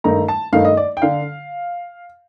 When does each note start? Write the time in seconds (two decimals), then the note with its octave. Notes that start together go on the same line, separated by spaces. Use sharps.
0.04 G2 D#3 A3 D#4 A#5
0.28 A5
0.53 G2 D#3 A3 D#4 F5
0.65 D#5
0.77 D5
0.97 G5
1.02 D3 F5